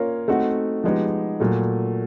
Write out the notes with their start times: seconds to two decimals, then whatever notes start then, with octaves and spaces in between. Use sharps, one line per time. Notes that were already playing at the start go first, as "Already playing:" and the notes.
Already playing: A#3 C#4 F4 A#4 C#5
0.28 A3 C4 D#4 F#4
0.84 F3 G#3 B3 D#4 G4
1.40 A#2 F#3 A3